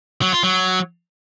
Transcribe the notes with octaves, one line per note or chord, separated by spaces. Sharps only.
F#3
F4
F#3